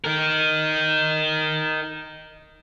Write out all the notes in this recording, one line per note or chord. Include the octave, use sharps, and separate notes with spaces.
D#4 A#4